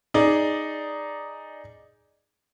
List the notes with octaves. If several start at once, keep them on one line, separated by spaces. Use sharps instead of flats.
D#4 G#4 D5